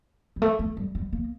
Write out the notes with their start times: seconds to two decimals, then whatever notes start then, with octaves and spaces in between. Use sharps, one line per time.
0.36 G3
0.42 A3
0.59 A3
0.77 G3
0.95 G3
1.13 A#3